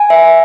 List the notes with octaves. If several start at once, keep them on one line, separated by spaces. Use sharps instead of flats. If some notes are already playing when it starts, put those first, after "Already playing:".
Already playing: G#5
E5